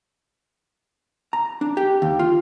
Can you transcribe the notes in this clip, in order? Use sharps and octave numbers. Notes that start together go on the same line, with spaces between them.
A#5
D4
G4
D#2
F4